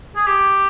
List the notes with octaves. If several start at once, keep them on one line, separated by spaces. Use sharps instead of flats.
G#4
G4